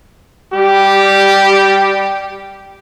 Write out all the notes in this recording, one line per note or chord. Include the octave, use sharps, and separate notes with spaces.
G3 G4